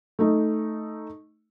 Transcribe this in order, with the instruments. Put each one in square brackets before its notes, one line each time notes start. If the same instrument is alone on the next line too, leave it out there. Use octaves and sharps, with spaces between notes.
[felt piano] A3 D#4